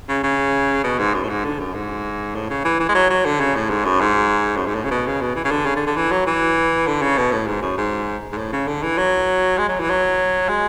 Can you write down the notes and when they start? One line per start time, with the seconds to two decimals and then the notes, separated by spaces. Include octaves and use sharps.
0.08 C#3
0.24 C#3
0.84 B2
0.99 G#2
1.14 F#2
1.23 A2
1.29 G#2
1.44 D3
1.59 F#2
1.74 G#2
2.35 A2
2.50 C#3
2.65 E3
2.80 E3
2.89 G#3
2.95 F#3
3.10 F#3
3.25 D3
3.40 C#3
3.56 A2
3.70 G#2
3.85 F#2
4.01 G#2
4.57 F#2
4.67 G#2
4.75 A2
4.84 C#3
4.91 B2
5.07 C#3
5.21 B2
5.36 E3
5.45 C#3
5.51 D3
5.66 C#3
5.76 D3
5.86 D3
5.96 E3
6.12 F#3
6.26 E3
6.87 D3
7.02 C#3
7.18 B2
7.32 A2
7.47 G#2
7.62 F#2
7.78 G#2
8.32 G#2
8.38 A2
8.53 C#3
8.68 D3
8.83 E3
8.98 F#3
9.58 G#3
9.69 F#3
9.80 E3
9.90 F#3
10.49 G#3